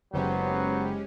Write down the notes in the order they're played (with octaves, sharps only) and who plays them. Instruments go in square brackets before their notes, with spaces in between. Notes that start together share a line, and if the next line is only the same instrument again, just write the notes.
[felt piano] F#1 [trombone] F#3 [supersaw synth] G#3 C#4 G4 [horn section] B3 C5